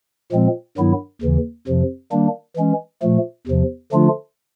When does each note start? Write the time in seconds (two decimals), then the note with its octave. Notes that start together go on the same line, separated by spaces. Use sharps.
0.32 A#2 F3 G#3 C4
0.77 G2 D#3 F#3 B3 E4
1.22 D#2 C#3 E3
1.67 F2 C3 F3
2.12 D#3 G3 A#3 D4
2.56 E3 G#3 C#4
3.02 A#2 F3 A3
3.47 E2 C3 F3
3.92 D3 F3 A3 D4 F4